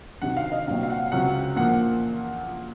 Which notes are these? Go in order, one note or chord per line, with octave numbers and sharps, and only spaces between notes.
C3 D#3 F#3 F#5
F5
D#5
C2 A#2 F#3 C4 F5
F5
F#5
C#2 C3 F#3 C4 F#5
A#2 F3 A#3 F#5